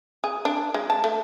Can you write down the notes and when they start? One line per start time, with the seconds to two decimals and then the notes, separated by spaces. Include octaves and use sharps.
0.24 G#4
0.45 D4
0.74 G#3
0.90 A5
1.04 A3